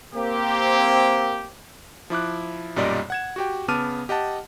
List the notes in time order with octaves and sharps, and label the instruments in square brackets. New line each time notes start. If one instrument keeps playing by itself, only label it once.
[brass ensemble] A#3 C4 G4
[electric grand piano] F3 E4 D6 F#6
B1 F#2 A#2 G3 D5 D#5
F#5 G#6 E7
F#4 G4 G5
C#3 B3 A5 D6 F6 D#7
G4 D#5 F#5 A5